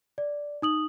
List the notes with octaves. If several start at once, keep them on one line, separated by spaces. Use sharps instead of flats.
D5
D#4 D#6 F#7